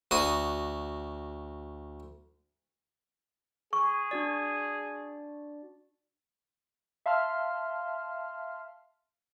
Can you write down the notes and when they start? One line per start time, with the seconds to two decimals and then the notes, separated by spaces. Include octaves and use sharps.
0.11 D2 F#4 D#6
3.73 G#4 C#6
4.11 D4 F#4 D5
7.06 E5 F5 A5 C6 F6